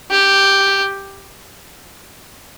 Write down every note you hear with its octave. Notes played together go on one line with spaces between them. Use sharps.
G4